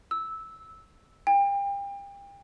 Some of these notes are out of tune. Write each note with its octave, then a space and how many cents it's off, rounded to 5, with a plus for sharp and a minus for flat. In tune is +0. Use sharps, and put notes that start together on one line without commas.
E6 -15
G5 +35